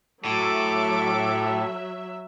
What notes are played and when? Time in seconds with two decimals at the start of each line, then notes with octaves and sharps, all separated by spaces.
0.24 A2 F#3 A4 E5 D6